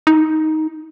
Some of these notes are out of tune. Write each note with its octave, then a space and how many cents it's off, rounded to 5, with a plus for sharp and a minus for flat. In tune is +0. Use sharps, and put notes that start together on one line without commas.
D#4 +10